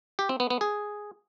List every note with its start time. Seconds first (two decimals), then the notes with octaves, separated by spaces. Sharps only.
0.19 G4
0.29 C4
0.40 B3
0.50 B3
0.61 G#4